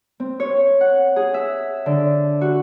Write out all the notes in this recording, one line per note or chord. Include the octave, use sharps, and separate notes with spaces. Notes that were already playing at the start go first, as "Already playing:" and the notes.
C4
C#5
F#5
G#4
E5
D3
F#4